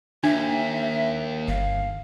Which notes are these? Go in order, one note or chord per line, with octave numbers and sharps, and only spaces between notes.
D#2 D4 E5
G1 F5